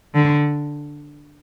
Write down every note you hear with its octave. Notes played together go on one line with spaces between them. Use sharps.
D3